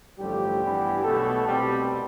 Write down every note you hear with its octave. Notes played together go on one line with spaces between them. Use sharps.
A1 G2 D3 F3 G3 A3 G4
G2 E3 B3
B1 B2 A3 B3 A4
C2 B2 G3 A3 C4 G4